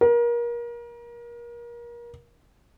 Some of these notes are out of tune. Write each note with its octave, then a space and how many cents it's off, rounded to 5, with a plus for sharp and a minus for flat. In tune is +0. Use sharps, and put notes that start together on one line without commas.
A#4 +30